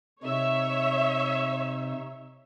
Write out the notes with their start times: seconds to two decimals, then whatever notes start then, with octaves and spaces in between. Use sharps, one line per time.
0.23 C3 D#4 C#5 E5